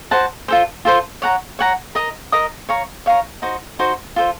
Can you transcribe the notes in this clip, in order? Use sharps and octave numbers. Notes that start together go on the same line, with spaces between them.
F#4 C5 F#5 A5
F4 A4 C5
F4 A4 C5
C#5 F#5 A#5
C#5 F#5 A#5
A#4 D#5 A#5 D#6
A#4 D#5 A#5 D#6
C#5 F5 A#5 C#6
C#5 F5 A#5 C#6
D#4 F#4 C5
D#4 F#4 C5
F4 A4 C5